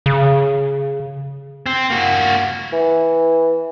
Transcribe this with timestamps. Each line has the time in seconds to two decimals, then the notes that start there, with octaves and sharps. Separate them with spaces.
0.06 C#3
1.66 C4
1.90 A#3 F#4
2.72 E3